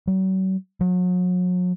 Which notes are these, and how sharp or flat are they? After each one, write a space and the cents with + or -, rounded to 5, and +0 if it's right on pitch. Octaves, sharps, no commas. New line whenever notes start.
F#3 +40
F#3 -40